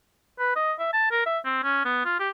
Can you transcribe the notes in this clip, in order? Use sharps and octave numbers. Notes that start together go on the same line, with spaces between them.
B4
D#5
E5
A5
A#4
E5
C4
C#4
B3
F4
G4